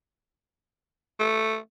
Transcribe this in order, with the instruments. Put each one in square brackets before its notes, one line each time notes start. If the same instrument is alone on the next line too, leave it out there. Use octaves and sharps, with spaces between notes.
[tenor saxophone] A3